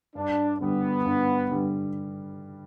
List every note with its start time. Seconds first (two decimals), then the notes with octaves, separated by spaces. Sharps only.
0.15 G2 D4
0.60 D3 G3 B3
1.06 G2
1.51 D3 G3